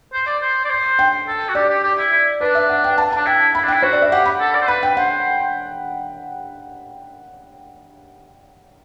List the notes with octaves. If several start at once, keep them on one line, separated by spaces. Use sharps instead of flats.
C5
D5
C5
D5
C5
G5
A4
F#4
G4 D5
G4
G4
E4
E4
D4 B4
E5
F#5
G5
A5
D4 A5
E4 G5
E4 B5
D4
E4 G5
F#4 C5
D5
E5
G4 F#5
B5
A4
D5
C5
B4 B5
G5
C5 F#5